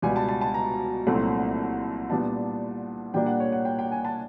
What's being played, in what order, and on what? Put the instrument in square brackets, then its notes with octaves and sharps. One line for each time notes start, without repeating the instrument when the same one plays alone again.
[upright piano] C#2 B2 G3 G#5
A5
A5
A5
A#5
C2 A#2 F#3 A3 C4
A#2 G3 B3 D4 A5
A#2 G3 A#3 D4 G5
F#5
C#5
F#5
G5
G5
G#5
A5